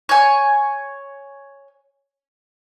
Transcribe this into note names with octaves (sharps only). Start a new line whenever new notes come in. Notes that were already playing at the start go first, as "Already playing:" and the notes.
C#5 G#5